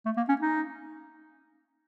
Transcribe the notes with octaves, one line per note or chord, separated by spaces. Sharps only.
A3
A#3
C#4
D#4